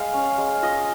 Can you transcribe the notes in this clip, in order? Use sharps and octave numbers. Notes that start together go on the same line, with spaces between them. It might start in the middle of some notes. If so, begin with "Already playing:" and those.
Already playing: G#3 F5
C#4
G#3
F4 D#5